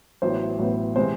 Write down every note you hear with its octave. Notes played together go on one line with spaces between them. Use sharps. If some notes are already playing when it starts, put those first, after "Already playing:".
A1 A2 F#3 B3 C5
A1 A2 F#3 B3
C3 E3 G#3 C4 C5